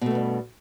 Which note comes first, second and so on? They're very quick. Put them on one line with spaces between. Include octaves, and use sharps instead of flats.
B2 A3 B3 G2